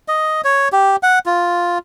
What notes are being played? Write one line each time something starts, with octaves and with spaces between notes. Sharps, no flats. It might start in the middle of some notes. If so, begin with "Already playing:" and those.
D#5
C#5
G4
F#5
F4